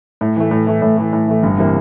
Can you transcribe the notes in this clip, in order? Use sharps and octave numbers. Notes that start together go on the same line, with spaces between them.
A2
E3 A3
A2
E3 A3
A2
E3 A3
A2
E3 A3
G1
C3 E3 A#3